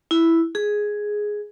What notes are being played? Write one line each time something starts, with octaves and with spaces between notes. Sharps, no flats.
E4
G#4